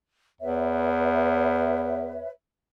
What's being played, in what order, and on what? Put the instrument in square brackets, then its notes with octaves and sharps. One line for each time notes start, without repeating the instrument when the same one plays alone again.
[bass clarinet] E2 [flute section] B4 C#5 E5